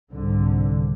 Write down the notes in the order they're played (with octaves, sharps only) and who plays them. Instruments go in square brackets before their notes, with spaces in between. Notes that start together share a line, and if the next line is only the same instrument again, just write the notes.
[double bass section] C2 G#2 D3